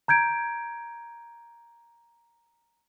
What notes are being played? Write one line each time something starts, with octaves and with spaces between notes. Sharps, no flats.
A#5 G6 G#6 D7